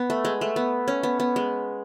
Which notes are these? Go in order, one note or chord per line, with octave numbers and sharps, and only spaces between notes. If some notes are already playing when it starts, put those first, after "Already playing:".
Already playing: B3
A3
G#3
A3
B3
C#4
B3
B3
G#3